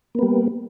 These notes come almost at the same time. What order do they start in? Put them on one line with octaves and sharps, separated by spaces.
A#3 B3 G3